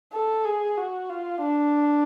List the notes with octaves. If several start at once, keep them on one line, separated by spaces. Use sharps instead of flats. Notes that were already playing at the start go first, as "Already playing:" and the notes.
A4
G#4
F#4
F4
D4